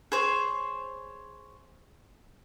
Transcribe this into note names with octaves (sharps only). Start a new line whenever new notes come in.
G#4 C5 C#5